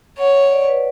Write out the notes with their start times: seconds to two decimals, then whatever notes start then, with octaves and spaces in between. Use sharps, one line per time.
0.18 C#5 F#5
0.35 E5
0.51 D5
0.68 B4